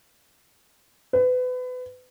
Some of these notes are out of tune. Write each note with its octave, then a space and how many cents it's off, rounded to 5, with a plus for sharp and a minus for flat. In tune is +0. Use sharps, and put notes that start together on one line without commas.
B4 +30